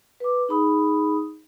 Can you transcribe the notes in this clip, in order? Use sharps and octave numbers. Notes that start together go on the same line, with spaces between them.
B4 D6
D#4 G#4 B5 D#6